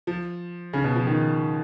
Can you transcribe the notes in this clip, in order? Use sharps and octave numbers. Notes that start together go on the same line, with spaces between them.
F3
C#3
B2
F3
D#3